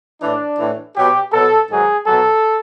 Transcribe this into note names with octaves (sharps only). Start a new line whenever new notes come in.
A2 E3 D4
A2 E3
B2 F#3 G4
B2 F#3 A4
G#2 D#3 F#3 G#4
B2 F#3 A4